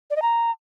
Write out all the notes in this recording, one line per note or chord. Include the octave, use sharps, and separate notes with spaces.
D5
D#5
A#5